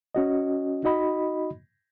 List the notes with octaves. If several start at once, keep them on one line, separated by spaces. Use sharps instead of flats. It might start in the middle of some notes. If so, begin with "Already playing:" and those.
C#4 F#4 D#5
D#4 F#4 D#5 B5